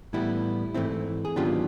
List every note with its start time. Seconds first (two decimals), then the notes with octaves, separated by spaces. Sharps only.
0.13 A2 E3 G3 B3 E4
0.74 G#2 E3 A3 C4 E4
1.25 G#4
1.36 G#2 D#3 F#3 B3 D4 F4 G4